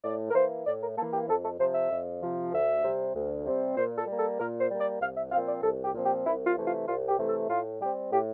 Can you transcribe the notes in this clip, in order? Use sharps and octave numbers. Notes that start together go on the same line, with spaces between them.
A2 D5
A#4
E3 A#3 C5
A2 D5
A#4
E3 A#3 A4
G4
F2 A4
A4
C3 F3 C5
E5
F2
C3 F3
D2 E5
C3 G3 C4
D2
C3 G3 C4
A#2 C5
A4
G3 A#3
A4
A#2 A#4
C5
G3 A#3
D5
C2 F5
E5
A#2 F3 C4 F5
D5
C2 A4
G4
A#2 F3 C4
G4
C2 E4
F4
C3 E3 A3
F4
C2 F4
G4
C3 E3 A3
A4
A2 F4
G3 C4 G4
A2 G4